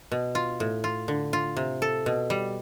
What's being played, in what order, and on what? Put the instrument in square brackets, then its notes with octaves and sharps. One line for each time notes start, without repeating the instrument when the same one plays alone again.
[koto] B2
F4
A2
F4
D3
F4
C3
A4
B2
G3